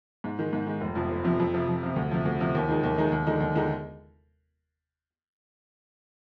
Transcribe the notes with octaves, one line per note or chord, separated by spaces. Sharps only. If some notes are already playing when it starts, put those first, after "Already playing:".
G#2
D#3 G#3
G#2
D#3 G#3
F1
F2 C3 F3
F1
F2 C3 F3
F2
C3 F3
F2
C3 F3
D2
C3 F3
D2
C3 F3
D#2
D#3 G#3 D#4 G#4
D#2
D#3 G#3 D#4 G#4
D#2
D3 G#3 D#4
D#2
D3 G#3 D#4